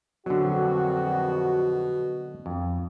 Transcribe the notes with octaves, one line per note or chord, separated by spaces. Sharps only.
A#1 F2 B2 D3 F#3 F#4
F2